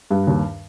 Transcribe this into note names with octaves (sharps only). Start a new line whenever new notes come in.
G2
D#2